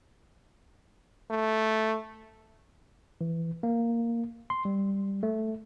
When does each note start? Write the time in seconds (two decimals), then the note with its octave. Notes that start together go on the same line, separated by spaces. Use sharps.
1.31 A3
3.21 E3
3.63 A#3
4.50 C6
4.65 G3
5.23 A3